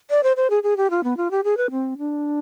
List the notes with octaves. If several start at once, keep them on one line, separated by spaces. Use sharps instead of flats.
D5
C5
C5
G#4
G#4
G4
F4
B3
F4
G4
G#4
B4
C4
D4